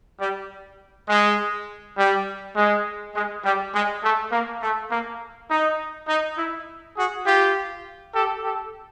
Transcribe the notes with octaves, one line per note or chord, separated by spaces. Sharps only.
G3
G#3
G3
G#3
G#3
G3
G#3
A3
A#3
A3
A#3
D#4
D#4
E4
F#4 G#4
F4 G4
G4 A4
G4 A4